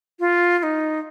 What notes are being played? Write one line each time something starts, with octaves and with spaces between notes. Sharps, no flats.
F4
F4
D#4